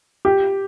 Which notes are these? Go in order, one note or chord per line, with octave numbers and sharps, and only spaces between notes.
G4